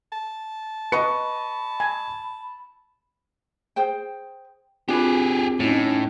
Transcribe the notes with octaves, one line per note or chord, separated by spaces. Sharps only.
A5
B4 D#5 B5 C#6 C#7
G#5
G#4 C5 G5
C4 D4 F4 G4 G#4 B4
A2 C#4 D#4